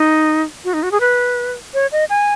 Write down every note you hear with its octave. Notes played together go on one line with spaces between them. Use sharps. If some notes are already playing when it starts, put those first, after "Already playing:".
Already playing: D#4
F#4
D#4
F#4
G#4
B4
C#5
D#5
G#5